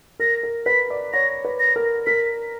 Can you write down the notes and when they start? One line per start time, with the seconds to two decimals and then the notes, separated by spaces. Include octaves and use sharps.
0.20 A#4 A#6
0.43 A#4
0.66 B4 B6
0.90 D5
1.13 C#5 A#6
1.45 B4
1.60 A#6
1.76 A#4
2.06 A#4 B6